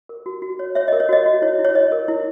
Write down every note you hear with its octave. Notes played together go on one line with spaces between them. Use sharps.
A#4
F#4
F#4
C#5
C#5 E5
A#4 D#5
C#5
F#4 D#5
F#4
E4 C#5
E4
C#5
C#5 D#5
A#4
E4